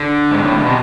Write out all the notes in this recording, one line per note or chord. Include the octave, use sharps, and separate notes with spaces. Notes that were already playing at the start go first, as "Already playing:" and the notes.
Already playing: D3
G#2
A2
B2
C3